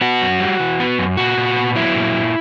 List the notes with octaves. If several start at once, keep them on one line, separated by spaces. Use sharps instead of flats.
B3 F#4
F#2
G3
E3
B3
F#2
A#2 F#4
A#2
B3
F#3 E4
A#2
A#2